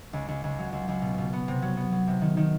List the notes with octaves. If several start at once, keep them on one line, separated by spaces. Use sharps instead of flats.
C#2
C#2
C#2
F#3
C#2
C#2
B2
B2
B3
C3
F#3
B3
F#3
C3
D#3
D#3